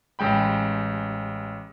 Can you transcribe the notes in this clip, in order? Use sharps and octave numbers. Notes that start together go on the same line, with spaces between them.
A1 G#3 G5 B5